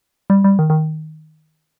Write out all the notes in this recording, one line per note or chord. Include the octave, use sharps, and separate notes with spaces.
G3
G3
D#3
D#3